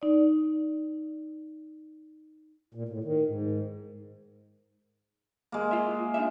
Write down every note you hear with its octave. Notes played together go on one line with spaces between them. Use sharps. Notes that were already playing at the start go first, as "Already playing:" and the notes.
D#4 D5
A#2
A2
D#3
G#2
G#3 A#3
F4 E5
D4 D#4 E5